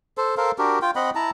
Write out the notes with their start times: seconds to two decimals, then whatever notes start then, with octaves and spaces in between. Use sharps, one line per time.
0.18 A4 C5
0.37 A4 A#4 C5 F5
0.58 D4 F#4 G4 A#4
0.82 F4 G5
0.96 C4 D#5 F#5 B5
1.15 E4 A5 A#5